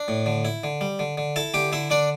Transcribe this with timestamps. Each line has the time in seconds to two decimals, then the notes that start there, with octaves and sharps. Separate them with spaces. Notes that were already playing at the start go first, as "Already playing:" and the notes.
Already playing: D4
0.08 A2
0.26 D3
0.45 E4
0.64 D3
0.81 G3
0.99 D3
1.18 D3
1.36 E4 A4 A5
1.54 D3 G4 G5
1.72 D3 E4 E5
1.90 D3 D4 D5